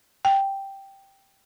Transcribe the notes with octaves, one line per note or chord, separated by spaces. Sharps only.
G5